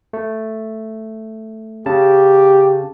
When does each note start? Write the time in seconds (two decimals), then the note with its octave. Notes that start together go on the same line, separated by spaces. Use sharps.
0.13 A3
1.86 C#3 G4 A5